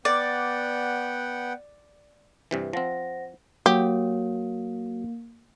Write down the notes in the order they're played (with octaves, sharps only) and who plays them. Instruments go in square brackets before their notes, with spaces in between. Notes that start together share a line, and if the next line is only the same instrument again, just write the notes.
[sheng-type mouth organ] B3 F#5 G5 [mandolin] D5
[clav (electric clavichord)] G2 C3 E3
[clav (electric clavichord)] F3 C4 [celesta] C5 F#5 A#6
[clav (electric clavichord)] F#3 [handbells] A#3 [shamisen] G4